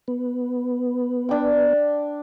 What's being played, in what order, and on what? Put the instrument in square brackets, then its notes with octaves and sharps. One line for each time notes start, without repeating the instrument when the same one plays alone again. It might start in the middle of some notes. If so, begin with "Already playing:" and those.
[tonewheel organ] B3
[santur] D4 G5